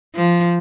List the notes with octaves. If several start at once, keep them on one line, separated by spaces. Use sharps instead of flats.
F3